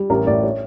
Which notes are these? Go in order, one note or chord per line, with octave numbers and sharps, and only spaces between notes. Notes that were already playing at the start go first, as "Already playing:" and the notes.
Already playing: G3
A1 A#4
A2 D5
C#5